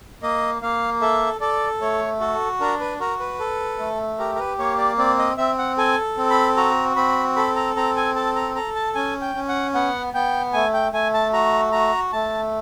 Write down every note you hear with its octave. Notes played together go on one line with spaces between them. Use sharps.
A#3 D#5
A#3 F5
A4 E5
A4 D5
A3 C#5
F#4 A4
D4 A#4
B4
F#4 A#4
B4
A4
A3
G4 A#4
A#4
B4
A#3 C#5
D5
C4 D5
D#5
C4 E5
F#5
A4 G#5
C4
B5
F#4 A#5
C4 B5
A4 B5
A#5
C4 A#5
G#5
A4 A5
A#5
A4 A#5
A5
C#4 G#5
G5
C#4
F#5
B3 F#5
B3 G5
A3 G#5
G5
A3 G#5
A5
F#4 A#5
F#4 A#5
A3 A5